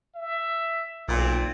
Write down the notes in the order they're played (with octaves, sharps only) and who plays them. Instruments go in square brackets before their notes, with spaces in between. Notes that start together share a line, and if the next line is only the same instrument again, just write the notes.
[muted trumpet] E5
[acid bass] B1 [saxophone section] A#2 [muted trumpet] C4